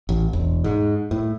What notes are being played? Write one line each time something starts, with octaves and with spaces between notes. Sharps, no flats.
A1
E1
G#2
A2